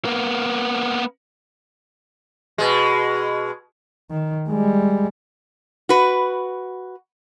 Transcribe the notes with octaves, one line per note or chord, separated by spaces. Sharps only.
A#3 B3
B2 G#3
D#3
G3 G#3
F#4 B4